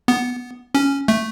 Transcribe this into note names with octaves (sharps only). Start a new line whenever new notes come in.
B3
C#4
A3